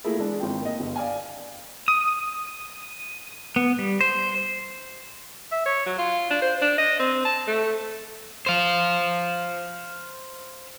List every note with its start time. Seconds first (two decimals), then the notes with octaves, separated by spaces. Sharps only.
0.04 A3 A#3 E4 F4 G#4 A#4
0.18 E3 G#3 D4
0.40 G#1 G5
0.61 A#3 D#5
0.80 G1
0.96 D5 F5 G#5
1.88 D#6
3.56 B3
3.79 G3
4.01 C5
5.52 E5
5.66 C#5
5.86 F#3
5.99 F4
6.30 D4
6.42 C5
6.62 D4
6.78 D#5
7.00 C4
7.25 A5
7.47 A3
8.46 C5 F5